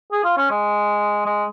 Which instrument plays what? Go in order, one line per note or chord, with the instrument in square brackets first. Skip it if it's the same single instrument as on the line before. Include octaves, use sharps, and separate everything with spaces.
[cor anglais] G#4
F4
C#4
G#3
G#3